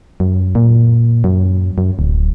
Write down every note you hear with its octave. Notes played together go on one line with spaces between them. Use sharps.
F#2
A#2
F#2
F#2
D1